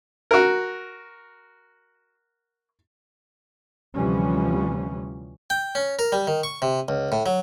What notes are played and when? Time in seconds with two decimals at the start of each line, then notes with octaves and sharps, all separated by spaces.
0.31 F#4 A#4
3.95 D2 C3 E3 F3 G3 C#4
5.50 G5
5.75 C#4
5.99 A#4
6.12 G3
6.27 D#3
6.43 C#6
6.62 C3
6.88 C#2
7.12 A2
7.26 F#3